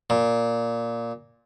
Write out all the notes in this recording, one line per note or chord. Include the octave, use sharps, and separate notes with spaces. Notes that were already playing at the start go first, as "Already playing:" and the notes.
A#2